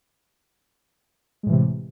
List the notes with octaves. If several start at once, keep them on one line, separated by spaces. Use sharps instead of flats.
A2 C3 E3 G#3